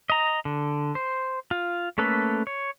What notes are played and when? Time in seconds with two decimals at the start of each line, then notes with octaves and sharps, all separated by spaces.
0.10 D#5 A#5
0.45 D3
0.95 C5
1.51 F4
1.98 A3 A#3 C#4 A4 B4
2.47 C#5